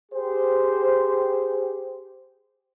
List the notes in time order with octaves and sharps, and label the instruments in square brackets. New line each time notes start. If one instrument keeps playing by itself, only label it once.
[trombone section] G4 G#4 C5